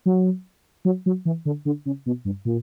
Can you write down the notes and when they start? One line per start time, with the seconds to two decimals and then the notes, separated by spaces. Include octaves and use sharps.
0.06 F#3
0.85 F#3
1.06 F#3
1.25 E3
1.45 D3
1.65 D3
1.86 C#3
2.06 B2
2.25 G2
2.45 A#2